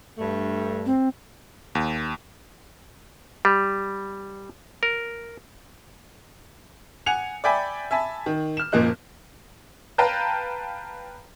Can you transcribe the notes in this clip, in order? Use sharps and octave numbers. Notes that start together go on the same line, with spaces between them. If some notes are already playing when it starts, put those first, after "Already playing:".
G2 A3
C4
D#2
G3
A#4
F#5 G#5 C#7 F7
D5 E5 G5 G#5 B5 D6
E5 G#5 A5 B5
D#3
F6 E7
F#1 A#2 F3 A#3 D#5 F#6
B4 F5 G5 A5 A#5 G6